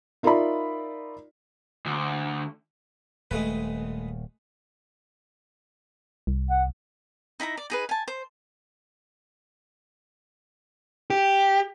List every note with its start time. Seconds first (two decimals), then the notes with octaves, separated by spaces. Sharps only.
0.23 D#4 F4 A#4 D5 E5 B5
1.86 D2
3.31 D#1 G#3 A3 B4
6.27 C2
6.48 F#5
7.40 D#4 E4 E5 A#5
7.57 D5
7.70 D#4 G#4 B4
7.89 G#5 A5
8.08 C5
11.10 G4